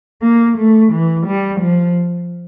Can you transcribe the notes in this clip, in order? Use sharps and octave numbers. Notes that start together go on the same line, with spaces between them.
A#3
A3
E3
G3
F3